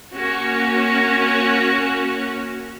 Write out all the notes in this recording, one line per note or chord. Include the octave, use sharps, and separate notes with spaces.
A#3 C#4 F#4